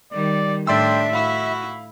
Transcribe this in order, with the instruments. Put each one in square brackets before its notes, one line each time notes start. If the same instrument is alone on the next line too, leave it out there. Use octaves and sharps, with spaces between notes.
[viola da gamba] D#3 G3 [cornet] D5
[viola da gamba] A2 D4 [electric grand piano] D5 C6 E6 [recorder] E5 [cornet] G5
[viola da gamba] E4 [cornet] F#4 [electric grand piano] F5 B5